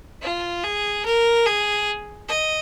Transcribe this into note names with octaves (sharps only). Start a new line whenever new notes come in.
F4
G#4
A#4
G#4
D#5